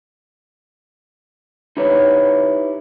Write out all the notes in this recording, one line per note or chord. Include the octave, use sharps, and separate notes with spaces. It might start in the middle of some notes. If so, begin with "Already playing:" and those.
D#4 E4 G4 B4 C#5